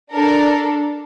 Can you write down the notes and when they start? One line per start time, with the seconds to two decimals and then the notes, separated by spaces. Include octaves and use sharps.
0.14 D4 A4 A#4